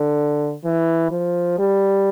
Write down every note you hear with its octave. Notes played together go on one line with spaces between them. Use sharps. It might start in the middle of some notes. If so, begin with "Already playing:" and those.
Already playing: D3
E3
F3
G3